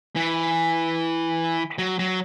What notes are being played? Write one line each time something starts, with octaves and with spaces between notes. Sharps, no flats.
E3
F#3
F#3